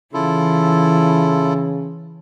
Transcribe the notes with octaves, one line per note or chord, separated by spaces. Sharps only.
C#3 E3 E4 F4 A4